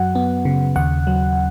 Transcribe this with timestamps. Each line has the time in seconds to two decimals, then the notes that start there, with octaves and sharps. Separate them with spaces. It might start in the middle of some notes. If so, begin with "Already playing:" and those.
Already playing: F#2 F#3 F#5
0.15 B3
0.45 C#3
0.76 D#2 F#5
1.07 F#3